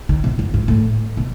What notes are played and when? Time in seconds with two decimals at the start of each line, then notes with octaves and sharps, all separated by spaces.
0.09 D#3
0.24 B2
0.39 F#2
0.54 G#2
0.68 A2
1.17 B2